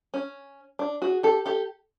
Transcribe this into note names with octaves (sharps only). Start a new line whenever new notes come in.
C#4
D4
F#4 G#4
G4 A4
G4 A4